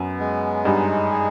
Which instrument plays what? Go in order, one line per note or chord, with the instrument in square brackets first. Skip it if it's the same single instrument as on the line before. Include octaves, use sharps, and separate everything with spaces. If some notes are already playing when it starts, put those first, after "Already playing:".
Already playing: [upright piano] F#2 [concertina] B3
[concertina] G#3
[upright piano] G2 [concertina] D#4
[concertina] G#4